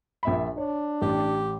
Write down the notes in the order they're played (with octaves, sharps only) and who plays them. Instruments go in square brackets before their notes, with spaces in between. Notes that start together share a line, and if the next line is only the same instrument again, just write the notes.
[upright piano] A#1 E5 B5
[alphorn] D4 [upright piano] C#5
[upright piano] A1 [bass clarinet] G4